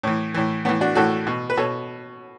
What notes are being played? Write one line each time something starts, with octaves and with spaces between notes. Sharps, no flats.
A2 E3
A2 E3
A2 E3 B3
D4 F#4
A2 E3 F#4 A4
B2
B4
B2 A4 C#5